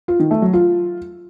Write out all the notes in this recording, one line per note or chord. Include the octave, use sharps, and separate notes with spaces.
F4
D#3
A3
F#3
F4